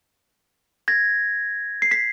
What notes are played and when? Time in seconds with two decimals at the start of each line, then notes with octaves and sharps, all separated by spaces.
0.88 G#6 A#6
1.82 C7
1.91 B6